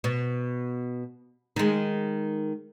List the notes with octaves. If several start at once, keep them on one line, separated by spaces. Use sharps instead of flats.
B2
D#3 G#3